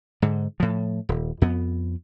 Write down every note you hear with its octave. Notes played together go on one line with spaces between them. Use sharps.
G#2 D3
A2 F3
D#1
F2 B3